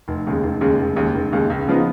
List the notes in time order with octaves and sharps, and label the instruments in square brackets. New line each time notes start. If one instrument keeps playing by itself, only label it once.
[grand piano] F1
D#2 C#3 G#3
F1
D#2 C#3 G#3
F1
D#2 C#3 G#3
F1
D#2 C#3 G#3
C#2
C#3 F3 B3 D#4